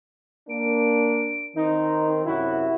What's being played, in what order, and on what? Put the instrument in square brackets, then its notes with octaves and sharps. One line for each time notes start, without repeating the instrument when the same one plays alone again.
[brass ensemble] A#3 D4 [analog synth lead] D7
[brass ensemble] D#3 C4 [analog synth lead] D#4
[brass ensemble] F#2 C3 F#4 [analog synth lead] E4